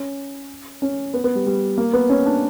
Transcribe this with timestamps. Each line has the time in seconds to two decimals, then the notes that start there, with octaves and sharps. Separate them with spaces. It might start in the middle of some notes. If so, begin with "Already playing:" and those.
Already playing: C#4
0.82 C#4
1.14 B3
1.24 B3
1.35 G3
1.46 G3
1.78 A#3
1.93 B3
2.10 C#4
2.26 D4